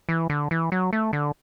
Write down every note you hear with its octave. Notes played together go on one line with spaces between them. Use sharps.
E3
D3
E3
F#3
A3
D3